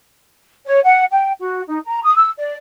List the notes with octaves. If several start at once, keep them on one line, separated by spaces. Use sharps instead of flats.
C#5
F#5
G5
F#4
D#4
A#5
D#6
E6
D5